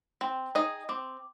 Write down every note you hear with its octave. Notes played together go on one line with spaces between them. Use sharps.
C4 G5
D#4 G#4 D#5
C4 D6